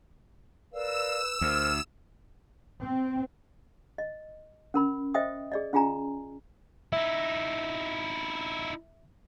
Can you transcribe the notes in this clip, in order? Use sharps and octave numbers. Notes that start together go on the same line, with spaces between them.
A#4 B4 D5 F5 E6 E7
D2 A#4 C5 F6
C4
D#5
C#4 A#4 B5
C5 D#5 E5 G5 D#6
G#4 D5 D#5
C#4 F4 G#4 G#5 A#5
D#4 E4 E5